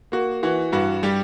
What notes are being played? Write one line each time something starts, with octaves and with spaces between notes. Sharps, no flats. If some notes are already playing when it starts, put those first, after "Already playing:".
A#3 F#4
E3 F#4
G2 F#4
G3 G4